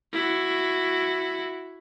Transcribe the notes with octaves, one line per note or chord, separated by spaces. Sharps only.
E4 F#4